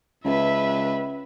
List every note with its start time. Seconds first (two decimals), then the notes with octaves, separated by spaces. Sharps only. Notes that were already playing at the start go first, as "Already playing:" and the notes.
0.25 C#2 B4 E5